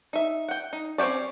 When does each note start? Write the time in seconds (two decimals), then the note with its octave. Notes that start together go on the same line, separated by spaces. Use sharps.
0.13 D#4 E5
0.49 F#5 G5
0.73 D#4
0.98 C4 C#4 F#4 G4 D5